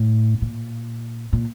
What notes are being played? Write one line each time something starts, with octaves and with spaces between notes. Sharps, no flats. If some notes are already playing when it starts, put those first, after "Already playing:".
Already playing: A2
A#2
A#2